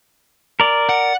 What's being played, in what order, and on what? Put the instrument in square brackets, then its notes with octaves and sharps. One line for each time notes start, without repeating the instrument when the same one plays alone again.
[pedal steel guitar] A#4 D5
[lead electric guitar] F#5